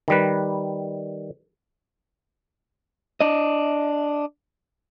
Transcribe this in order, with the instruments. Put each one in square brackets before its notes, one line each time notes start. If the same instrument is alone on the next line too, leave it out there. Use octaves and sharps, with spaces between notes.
[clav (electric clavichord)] D#3 G3 B4
[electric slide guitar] D4 D#5